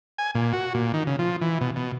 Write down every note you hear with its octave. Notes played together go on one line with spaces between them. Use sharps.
G#5
A#2
F#4
A#2
D#3
C#3
F3
E3
B2
B2